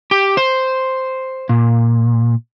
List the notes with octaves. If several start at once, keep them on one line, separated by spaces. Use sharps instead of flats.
G4
C5
A#2